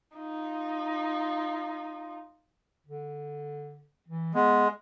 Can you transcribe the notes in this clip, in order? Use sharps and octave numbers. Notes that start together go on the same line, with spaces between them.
D#4 F4
D3
E3
G#3 B3